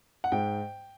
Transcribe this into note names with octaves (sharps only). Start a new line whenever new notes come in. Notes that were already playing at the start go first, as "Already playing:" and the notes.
F#5
G#2 G5